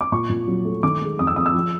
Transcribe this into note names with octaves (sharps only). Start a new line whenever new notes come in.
D6
A#2 C#6
A#2
F#3
A3
D#3 D6
G#3
F2 D#6
E6
F2 D#6
E6
F3